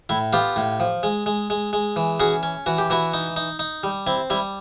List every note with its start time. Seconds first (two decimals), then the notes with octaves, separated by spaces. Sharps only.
0.09 A2 E4
0.33 B3 F4 G4
0.56 A2
0.80 F3
1.03 G#3
1.26 G#3
1.50 G#3
1.73 G#3
1.96 E3
2.20 C#4 F#4 G#4
2.43 C#4
2.66 E3 F#4
2.78 G4
2.90 E3 E4 F#4
3.14 D#4
3.36 D#4
3.59 D#4
3.83 G3
4.07 C4 E4
4.30 G3 E4